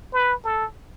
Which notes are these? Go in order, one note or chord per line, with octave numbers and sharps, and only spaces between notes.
B4
A4